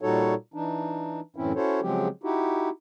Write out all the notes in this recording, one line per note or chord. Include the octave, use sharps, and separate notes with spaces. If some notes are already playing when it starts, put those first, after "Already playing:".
A#2 G3 D#4 F#4 A4 C#5
E3 D4 D#4
F#2 A2 E3 C4 C#4 E4
C#4 E4 F#4 A4 C5 C#5
C#3 F3 F#3 G#3 C4 G4
D#4 E4 F#4 G4